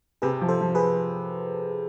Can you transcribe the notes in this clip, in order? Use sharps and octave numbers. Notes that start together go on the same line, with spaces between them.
C3 G#4 B4
F3
A4 C5
F3
G#4 B4